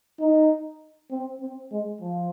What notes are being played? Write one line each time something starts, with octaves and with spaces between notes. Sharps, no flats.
D#4
C4
C4
G#3
F3